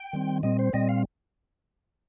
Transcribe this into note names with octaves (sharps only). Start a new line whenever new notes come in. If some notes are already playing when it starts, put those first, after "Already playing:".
Already playing: G5
D#3 G3 C4
A#2 G3 C4 D#5
C5
A#2 G3 C4 D#5
F5